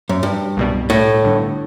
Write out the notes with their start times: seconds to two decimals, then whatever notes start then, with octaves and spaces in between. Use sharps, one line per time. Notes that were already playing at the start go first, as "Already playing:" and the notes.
0.09 F#2
0.23 G2
0.57 C2 B2 G3
0.90 A2
1.22 G1 G2 D3